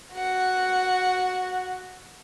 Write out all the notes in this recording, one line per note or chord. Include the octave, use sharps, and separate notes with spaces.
F#4 F#5